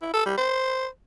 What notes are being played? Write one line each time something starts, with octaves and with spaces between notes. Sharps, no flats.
E4
A4
G3
C5